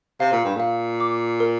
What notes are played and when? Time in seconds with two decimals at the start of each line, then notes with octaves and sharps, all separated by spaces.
0.20 C3 F5
0.32 A#2
0.44 G2
0.56 A#2 F5
1.00 D6
1.40 A#4